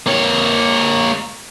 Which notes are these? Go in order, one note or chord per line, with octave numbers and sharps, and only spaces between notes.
A#3 C#5